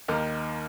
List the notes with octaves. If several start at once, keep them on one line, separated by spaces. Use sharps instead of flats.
D#2 D#3 A#3